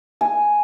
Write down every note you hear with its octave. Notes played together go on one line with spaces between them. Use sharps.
G#5